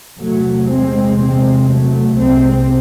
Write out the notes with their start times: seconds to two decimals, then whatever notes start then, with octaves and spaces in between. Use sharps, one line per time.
0.18 E2 C3 F#3 A3
0.68 G#3 C4
1.19 G#3 C4
1.69 F#3 A3
2.19 C2 C3 G#3 C4